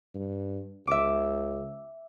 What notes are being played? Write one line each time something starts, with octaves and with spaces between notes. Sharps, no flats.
G2
C#2 E5 D6